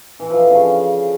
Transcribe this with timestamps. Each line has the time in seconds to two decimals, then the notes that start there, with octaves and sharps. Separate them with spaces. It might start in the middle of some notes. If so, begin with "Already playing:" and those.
0.20 E3
0.30 F3
0.40 D3
0.51 C#3